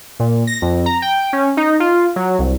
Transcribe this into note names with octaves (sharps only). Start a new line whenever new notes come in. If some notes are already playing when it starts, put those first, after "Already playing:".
A#2
A#6
F2
A#5
G5
C#4
D#4
F4
F#3
C2